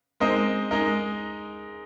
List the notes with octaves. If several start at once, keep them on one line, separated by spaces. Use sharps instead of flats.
G#3 C4 D#4 A#4 D#5
G#3 D#4 A#4 D#5